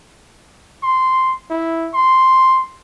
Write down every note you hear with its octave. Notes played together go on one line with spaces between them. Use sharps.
C6
E4
C6